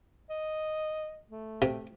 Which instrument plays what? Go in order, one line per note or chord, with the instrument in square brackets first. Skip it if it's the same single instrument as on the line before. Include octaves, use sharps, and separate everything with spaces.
[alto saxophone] D#5
A3
[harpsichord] C3